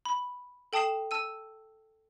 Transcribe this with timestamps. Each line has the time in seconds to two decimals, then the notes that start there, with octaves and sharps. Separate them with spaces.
0.05 B5
0.73 A4 G5 A5 D#6 C7 E7
1.11 A5 E6 D#7